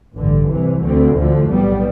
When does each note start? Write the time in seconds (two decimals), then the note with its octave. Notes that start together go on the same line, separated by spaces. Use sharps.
0.14 A1 G2 D3
0.48 C2 C3 E3
0.82 D2 D3 A3 C4
1.16 D2 D3 F3 A3
1.48 B1 A2 G3 B3